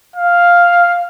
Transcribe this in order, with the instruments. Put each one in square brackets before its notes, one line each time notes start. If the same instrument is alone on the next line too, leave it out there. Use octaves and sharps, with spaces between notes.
[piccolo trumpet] F5